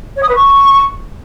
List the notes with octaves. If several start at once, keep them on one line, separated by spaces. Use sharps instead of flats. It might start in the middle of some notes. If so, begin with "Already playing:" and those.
C#5
D#6
B4
C#6